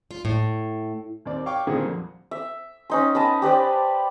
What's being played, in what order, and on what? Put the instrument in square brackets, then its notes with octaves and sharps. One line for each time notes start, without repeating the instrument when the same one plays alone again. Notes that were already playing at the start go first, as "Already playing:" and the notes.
[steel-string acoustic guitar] F4
A2
[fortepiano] D#2 C4 D5
C#5 F5 G5 C#6 D6
A#2 D3 D#3 G3 C4 G#4
F2
[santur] E5
C#4 D#4 C6
B4 D#5 A5
G4 B4 C5 D5